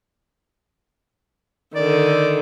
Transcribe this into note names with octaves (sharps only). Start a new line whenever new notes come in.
D3 D#3 D5